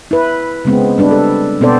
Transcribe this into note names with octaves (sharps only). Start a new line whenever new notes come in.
E4 B4
C#3 G#3 B3 C4
G3 D4 B4
A4
B2 B3 C4 A4 C5 D5